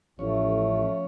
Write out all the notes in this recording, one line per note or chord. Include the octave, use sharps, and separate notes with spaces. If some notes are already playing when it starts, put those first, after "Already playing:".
A1 F3 A3 C#4 C#5